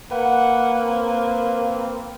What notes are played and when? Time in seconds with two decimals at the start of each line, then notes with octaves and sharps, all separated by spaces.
0.11 A#3 B4 F#5
0.83 C4